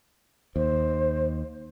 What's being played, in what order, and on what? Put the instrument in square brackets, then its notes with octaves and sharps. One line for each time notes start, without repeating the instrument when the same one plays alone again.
[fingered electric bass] D#2 [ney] C5